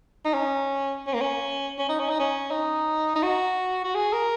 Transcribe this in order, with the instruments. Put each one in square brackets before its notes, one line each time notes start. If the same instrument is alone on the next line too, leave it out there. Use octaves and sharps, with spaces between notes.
[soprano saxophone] D#4
C#4
C#4
A#3
C#4
C#4
D#4
C#4
D#4
C#4
D#4
D#4
F#4
F#4
G#4
A#4